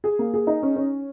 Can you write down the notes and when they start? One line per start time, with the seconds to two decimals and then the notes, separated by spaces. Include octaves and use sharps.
0.04 G#4
0.19 A#3
0.34 G#4
0.47 D#4
0.63 C#4
0.76 C#4